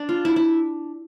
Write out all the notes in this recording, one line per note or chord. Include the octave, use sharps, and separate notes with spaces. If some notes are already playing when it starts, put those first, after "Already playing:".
Already playing: D4
F4
E4
E4